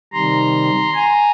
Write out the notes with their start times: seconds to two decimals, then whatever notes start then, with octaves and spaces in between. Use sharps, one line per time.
0.13 C3 D#3 G3 A#5 C6
0.94 G#5 A#5